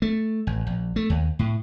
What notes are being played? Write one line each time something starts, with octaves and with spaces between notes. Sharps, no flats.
A3
A1
A#1
A3
D#2
A2